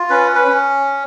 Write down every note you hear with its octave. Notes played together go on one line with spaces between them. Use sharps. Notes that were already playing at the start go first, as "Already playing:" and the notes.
Already playing: F4
C#4 B4
B4
C#4